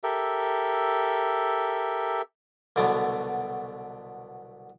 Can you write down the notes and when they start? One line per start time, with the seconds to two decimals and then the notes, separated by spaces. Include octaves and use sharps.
0.03 G4 A4 A#4 E5
2.76 C2 B2 D3 F#3 A3 B3